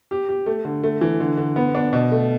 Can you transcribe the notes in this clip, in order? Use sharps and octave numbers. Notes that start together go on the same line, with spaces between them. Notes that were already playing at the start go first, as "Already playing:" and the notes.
G4
G4
A3
D3
A3
E3
D3
D3
B3
D4
B2
A3